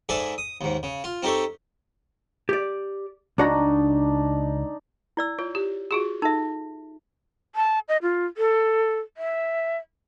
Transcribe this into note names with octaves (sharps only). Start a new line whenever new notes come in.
G#2 G#4 A4 D5 E5
D#6
D#2 G#2
C#3
F4
C4 D#4 G4 A4 C#5
G4 D5
C#2 D4 D#4 F#4 A#5
E4 D5 E6
F4 C#5
G4
F4 F#4 G#4
D#4 A4 E5
A5
D#5
F4
A4
E5